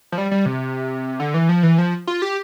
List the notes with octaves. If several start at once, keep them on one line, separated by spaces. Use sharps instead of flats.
F3
G3
G3
C3
D3
E3
F3
E3
F3
F4
G4